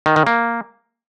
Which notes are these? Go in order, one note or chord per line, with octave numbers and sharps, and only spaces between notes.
D#3
D#3
A#3